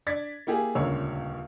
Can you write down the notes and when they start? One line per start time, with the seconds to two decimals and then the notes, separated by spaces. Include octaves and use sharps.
0.07 D4 D5 G#6 A6 B6
0.47 A#3 E4 G4 G#4
0.75 D#1 C#2 D3 A#4 C#5 E6